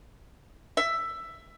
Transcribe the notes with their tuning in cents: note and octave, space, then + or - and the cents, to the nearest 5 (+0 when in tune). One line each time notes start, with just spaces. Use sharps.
E5 +10